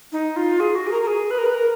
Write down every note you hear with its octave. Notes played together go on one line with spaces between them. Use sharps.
D#4
F4
G#4
F#4
G#4
A#4
A#4
G#4
B4
A#4
B4
A#4